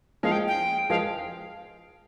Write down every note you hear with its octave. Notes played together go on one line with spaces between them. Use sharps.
F3 G#3 F5
G5
G5
F3 G#3 F5